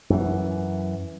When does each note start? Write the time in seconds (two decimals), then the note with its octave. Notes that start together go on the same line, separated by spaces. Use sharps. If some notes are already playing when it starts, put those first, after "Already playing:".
0.10 F#2 E3